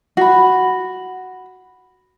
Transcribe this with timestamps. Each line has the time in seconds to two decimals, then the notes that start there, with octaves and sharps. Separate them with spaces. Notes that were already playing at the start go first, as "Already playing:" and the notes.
0.17 F#4 B5